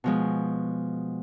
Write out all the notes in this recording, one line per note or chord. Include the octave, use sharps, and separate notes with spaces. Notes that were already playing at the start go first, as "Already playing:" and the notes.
B2 F3 G#3